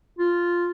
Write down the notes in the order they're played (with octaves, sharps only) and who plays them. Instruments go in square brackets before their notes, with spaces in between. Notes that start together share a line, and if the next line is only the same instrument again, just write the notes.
[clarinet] F4